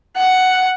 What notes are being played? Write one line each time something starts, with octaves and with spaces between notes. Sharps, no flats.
F#5